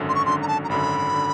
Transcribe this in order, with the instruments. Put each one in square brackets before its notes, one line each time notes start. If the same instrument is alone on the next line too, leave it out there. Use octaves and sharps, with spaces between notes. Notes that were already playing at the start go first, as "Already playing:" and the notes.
Already playing: [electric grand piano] G#1 F#2 D3
[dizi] C6
C#6
[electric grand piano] G#1 F#2 D3 [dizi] C6
[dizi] A#5
A5
A#5
[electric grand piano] G#1 F#2 D3 [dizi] B5
[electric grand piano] D3